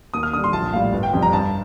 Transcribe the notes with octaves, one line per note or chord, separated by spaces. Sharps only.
D#2 D#6
F6
D3 D#6
G3
C6
A#1 A5
A2 G3 F5
G1
G5
F2 C3 G3
A#5
G2 A5